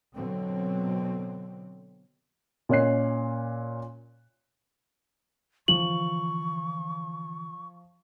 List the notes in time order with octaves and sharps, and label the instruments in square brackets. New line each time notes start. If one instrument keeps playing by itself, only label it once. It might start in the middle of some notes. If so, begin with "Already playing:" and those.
[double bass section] B2 D3 F#3 C4
[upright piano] A#2 C#4 C#5 D#5 F#6 C7
[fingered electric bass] D3 E3 [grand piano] F3 [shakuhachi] C#6 [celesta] F#7